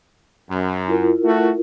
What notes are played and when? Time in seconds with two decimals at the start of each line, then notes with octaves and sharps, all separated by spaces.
0.50 F#2
0.88 E4 F4 A#4
1.25 A3 F#4